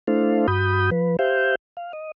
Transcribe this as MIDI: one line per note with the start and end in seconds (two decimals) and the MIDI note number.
0.07 0.47 57
0.07 0.47 62
0.07 0.47 64
0.07 0.47 69
0.07 0.47 72
0.07 0.47 77
0.48 0.90 43
0.48 0.90 66
0.48 0.90 83
0.48 0.90 87
0.48 0.90 91
0.91 1.16 53
0.91 1.16 71
1.19 1.55 67
1.19 1.55 72
1.19 1.55 76
1.19 1.55 77
1.19 1.55 91
1.77 1.92 77
1.93 2.11 75